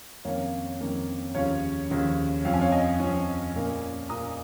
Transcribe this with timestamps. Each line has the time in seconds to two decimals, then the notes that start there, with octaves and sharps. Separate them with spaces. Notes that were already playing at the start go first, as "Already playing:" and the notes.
0.25 F2 D#3 A#3 C#4 C#5 F5
0.80 F2 D#3 A#3 C#4
1.34 D#2 C#3 F3 C#4 C#5 F5
1.90 D#2 C#3 F3 C#4
2.45 F2 F3 C#4 F5
2.54 G#5
2.61 C#5 F5
2.72 D#5 G#5
3.00 F2 F3 C#4
3.55 A#2 A#3 C#4
4.09 A#2 A#3 C#4 A#5 D#6